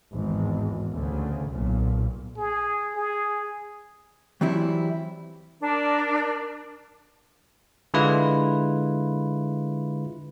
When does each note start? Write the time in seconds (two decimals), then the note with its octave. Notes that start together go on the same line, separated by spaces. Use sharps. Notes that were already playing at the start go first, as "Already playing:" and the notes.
0.14 G#1 E2
0.91 D2 C#3
1.48 B1 A#2
2.37 G#4
2.96 G#4
4.41 E3 F#3 G3 C4 E4
5.61 D4 A#4
7.94 D3 G#3 E4 F4 B4